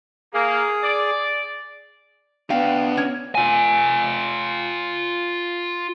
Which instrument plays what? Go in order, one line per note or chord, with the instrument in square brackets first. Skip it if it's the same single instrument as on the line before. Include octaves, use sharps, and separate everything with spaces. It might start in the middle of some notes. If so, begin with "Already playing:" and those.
[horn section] A#3 [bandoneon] G#4
[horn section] D5
[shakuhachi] B3 [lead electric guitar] D4 F#4 [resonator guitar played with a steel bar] F5 G5
[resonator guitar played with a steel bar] C#4 C#5
[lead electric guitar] F4 G#5